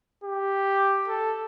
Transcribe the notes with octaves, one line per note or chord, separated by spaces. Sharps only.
G4
A4